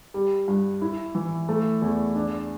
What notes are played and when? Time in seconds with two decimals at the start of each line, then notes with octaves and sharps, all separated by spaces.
0.14 G3
0.48 G2
0.82 E4
1.15 E3
1.49 A3
1.82 E2
2.15 D4